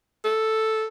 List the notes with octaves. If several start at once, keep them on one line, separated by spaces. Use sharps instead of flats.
A4